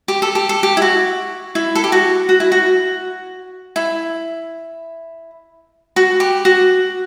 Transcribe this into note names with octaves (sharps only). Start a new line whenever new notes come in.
G4
A4
G4
A4
G4
E4
F#4
E4
A4
G4
F#4
F#4
E4
F#4
E4
F#4
G4
F#4